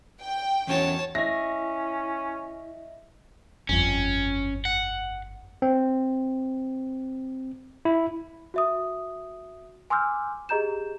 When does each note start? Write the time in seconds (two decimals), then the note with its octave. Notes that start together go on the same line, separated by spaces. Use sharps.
0.21 G5
0.67 E2 C#4 F#4 C#5 A5
1.15 C#4 E4 D#5 E5 A#6
3.69 G1 F2 C#4
4.65 F#5
5.62 C4
7.85 E4
8.54 F#4 E5 D#6
9.90 G#5 C6 D6 E6 F6 G6
10.49 G4 G#4 D#5 A#5 G6 E7